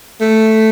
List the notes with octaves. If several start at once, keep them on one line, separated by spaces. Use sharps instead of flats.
A3